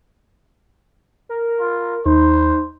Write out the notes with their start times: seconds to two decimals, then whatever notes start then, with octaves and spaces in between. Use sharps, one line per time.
1.29 A#4
1.60 F4
2.06 D#2 D#4 C5